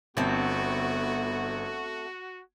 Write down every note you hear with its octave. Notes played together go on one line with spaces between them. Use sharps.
G1 A3 B3 C4 F#4